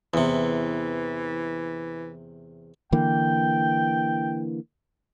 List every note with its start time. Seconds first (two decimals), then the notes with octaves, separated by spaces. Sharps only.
0.14 E2 C3 E3
2.92 D3 E3 A#3 G5